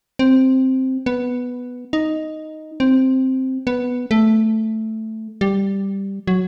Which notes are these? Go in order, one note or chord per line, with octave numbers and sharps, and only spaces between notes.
C4
B3
D#4
C4
B3
A3
G3
F#3